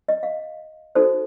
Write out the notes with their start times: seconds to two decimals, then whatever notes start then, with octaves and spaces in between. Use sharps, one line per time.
0.08 D#5
0.23 F5
0.95 D#4 F#4 A4 C5